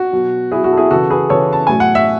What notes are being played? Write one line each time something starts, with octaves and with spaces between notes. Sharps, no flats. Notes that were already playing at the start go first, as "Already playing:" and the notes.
Already playing: F#4
B2 F#3
B2 F#3 E4 G#4
F#4
A4
E4 G#4
C#3 E3 F#4 A4
G#4 B4
C#3 E3 A4 C#5
A5
A2 F#3 G#5
F#5
E5